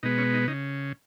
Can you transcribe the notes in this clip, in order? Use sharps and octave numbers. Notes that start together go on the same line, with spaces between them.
B2 G#3 B3 D#4
C#4
D#4
C#3 D#4